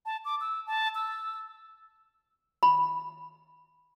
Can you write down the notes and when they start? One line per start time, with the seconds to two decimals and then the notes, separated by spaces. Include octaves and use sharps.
0.06 A5
0.25 D6
0.41 E6
0.67 A5
0.95 E6
2.63 B5